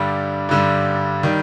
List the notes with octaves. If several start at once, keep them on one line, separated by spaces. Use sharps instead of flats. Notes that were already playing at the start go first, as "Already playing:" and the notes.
Already playing: G2 D3 G3 D4
G2 D3 G3 D4
D#3 G3